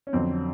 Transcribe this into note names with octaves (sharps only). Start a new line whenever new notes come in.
C#4
F2 D3 F#3 C4